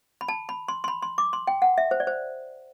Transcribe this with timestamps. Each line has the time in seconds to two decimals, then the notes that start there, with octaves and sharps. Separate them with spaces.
0.21 B5
0.28 A5
0.49 B5
0.68 C6
0.84 C6
0.88 B5
1.02 C6
1.18 D6
1.33 C6
1.47 G5
1.62 F#5
1.78 E5
1.91 C5
2.00 D5
2.07 C5